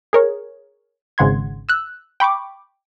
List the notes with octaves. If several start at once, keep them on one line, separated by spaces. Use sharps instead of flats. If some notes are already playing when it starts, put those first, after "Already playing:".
G#4 A#4 C#5
G#1 G#2 C#3 F#5 C6 G#6
E6 F#6
G5 B5 C#6 D6